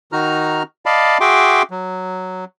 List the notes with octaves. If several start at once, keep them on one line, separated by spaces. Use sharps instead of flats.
D#3 D#4 F#4 A#5 F6
D5 D#5 F5 A5 B5
F#4 G#4 E5 G5 C6 D6
F#3